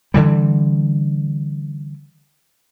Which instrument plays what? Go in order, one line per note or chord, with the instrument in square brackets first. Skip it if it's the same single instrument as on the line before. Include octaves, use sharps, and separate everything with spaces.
[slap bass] D3 E3 G3